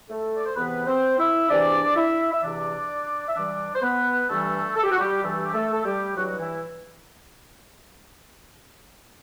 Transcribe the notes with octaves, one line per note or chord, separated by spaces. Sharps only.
A3 A4
D5
C5
E2 C3 E3 B3 B4
C4 C5
E4 E5
E2 C3 E3 D4 D5
E4 E5
E5
E2 C3 E3 D4 D5
E5
G2 E3 G3 D4 D5
C5
B3 B4
G2 E3 G3 A3 A4
A4
G4
F#4
G3 G4
G2 E3 G3 A3 A4
G4
A3 A4
A4
G3 G4
G2 E3 F#3 G3 F#4
F#4
E3 E4